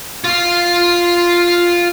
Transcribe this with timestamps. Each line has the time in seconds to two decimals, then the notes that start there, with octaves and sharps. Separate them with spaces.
0.24 F4 F5